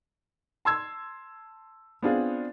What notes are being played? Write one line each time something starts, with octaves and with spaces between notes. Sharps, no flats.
A5 C6 E6 G#6
B3 C4 D4 F4 G#4